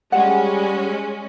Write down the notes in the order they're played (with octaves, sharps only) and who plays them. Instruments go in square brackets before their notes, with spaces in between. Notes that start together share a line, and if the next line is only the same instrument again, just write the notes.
[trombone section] G3 [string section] G#3 C#4 [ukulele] F#5